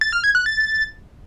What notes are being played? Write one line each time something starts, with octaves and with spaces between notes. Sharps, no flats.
A6
F6
G#6
F#6
A6